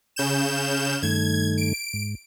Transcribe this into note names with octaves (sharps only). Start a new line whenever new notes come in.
C#3 G6 E7
F6
G2 D#3 A3 G#6
D7
G#2